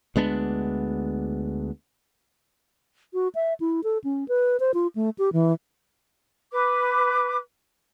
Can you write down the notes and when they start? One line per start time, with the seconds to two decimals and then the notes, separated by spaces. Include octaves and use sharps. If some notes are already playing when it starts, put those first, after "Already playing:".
0.16 D2 G#3 B3 D4
3.14 F#4
3.35 E5
3.60 E4
3.84 A4
4.04 C#4
4.28 B4
4.60 C5
4.74 F4
4.95 A3
5.19 G4
5.33 E3
6.51 B4 D6